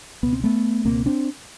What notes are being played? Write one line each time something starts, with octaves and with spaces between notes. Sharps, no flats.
C#2 B2 B3
C4
A3 B3
C#2 B2 A#3 C4
C4 D4